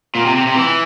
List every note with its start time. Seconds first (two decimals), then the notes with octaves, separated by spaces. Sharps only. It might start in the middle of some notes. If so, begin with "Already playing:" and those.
0.15 A#2
0.26 C3
0.36 C3
0.47 C3
0.56 E3